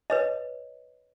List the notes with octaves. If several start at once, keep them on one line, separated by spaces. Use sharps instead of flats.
B4 C#5 D#5